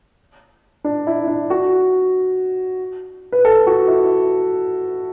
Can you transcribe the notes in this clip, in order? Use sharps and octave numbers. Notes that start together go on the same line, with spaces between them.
D4
E4
D4
F#4
B4
A4
F#4
E4